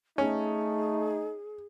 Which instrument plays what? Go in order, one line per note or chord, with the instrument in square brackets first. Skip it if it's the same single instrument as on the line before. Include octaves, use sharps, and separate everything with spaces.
[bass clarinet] A3 [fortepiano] C#4 [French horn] D#4 [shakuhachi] G#4